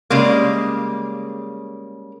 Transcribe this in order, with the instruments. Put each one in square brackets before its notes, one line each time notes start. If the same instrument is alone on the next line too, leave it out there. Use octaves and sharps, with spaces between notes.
[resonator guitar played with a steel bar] C#3 G3 G#3 A#3